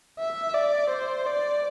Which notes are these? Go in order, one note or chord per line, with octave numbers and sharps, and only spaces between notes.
E5
D5
C5
D5